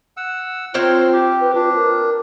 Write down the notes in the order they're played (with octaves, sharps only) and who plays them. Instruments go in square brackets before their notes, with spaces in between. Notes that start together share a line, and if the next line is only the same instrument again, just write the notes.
[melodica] F#5 E6
[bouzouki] C4 C5 G5 [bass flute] F4 [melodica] A#4 C#5
[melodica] G4
[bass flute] B4
[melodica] D4 [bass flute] F4
[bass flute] A#4